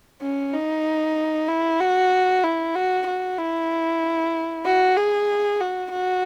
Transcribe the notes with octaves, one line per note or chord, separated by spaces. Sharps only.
C#4
D#4
E4
F#4
E4
F#4
F#4
E4
F#4
G#4
F#4
F#4